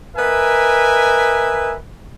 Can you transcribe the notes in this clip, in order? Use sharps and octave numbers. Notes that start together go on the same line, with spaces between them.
A#4 B4 D#5 E5 G#5